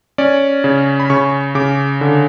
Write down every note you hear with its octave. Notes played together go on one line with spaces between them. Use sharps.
C#4 D5
C#3
B5
C#3 C#6
C#3 D6
D3